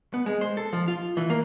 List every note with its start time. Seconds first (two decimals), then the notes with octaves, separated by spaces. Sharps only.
0.14 B3
0.26 G#3
0.41 C5
0.57 A4
0.73 F3
0.88 F4
1.17 E3
1.30 A#3